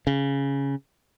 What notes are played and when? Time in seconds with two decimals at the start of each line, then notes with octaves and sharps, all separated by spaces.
0.07 C#3